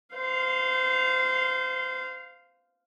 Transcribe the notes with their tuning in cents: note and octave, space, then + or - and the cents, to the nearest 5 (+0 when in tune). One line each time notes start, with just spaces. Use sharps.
C5 -25 F5 +0